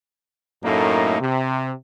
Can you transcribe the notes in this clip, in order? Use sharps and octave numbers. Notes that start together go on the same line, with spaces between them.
F#2 A2 A3 A#3 D#4
C3